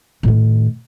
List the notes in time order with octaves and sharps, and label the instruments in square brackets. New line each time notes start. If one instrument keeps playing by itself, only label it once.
[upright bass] A2 D#3